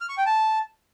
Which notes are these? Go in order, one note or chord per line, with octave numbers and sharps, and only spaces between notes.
F6
C#6
G5
A5